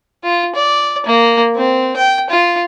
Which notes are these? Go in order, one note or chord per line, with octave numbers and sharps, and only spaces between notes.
F4
D5
A#3
C4
G5
F4